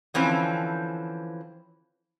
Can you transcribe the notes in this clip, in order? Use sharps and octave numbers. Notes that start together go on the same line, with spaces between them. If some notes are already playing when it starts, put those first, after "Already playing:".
D3 E3 F3 C4 C#4